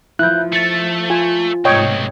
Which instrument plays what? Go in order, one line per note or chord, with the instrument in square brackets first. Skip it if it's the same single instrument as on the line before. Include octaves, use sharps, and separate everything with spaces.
[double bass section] F3 [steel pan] E4 [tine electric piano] F#6 G6
[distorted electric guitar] A3 [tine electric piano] A6 C#7
[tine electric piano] F4 [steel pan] G#5
[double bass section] F1 G#2 [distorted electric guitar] B1 [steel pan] C#5 D#5 G5